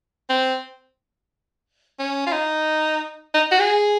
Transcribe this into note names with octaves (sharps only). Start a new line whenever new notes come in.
C4
C#4
F4
D#4
D#4
F#4
G#4